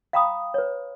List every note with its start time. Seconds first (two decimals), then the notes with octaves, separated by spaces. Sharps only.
0.13 F5 G5 A#5 B5 D#6
0.54 B4 C#5